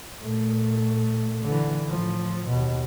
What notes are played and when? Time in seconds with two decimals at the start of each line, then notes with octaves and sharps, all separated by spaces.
0.20 A#2 A3
1.44 D3 E3
1.89 A2 F3
2.49 D#2 B2